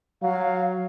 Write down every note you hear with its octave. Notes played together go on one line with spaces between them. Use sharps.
F#3 F5